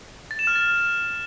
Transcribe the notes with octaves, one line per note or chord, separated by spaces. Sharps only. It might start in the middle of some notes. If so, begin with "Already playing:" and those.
A6
E7
F6
A6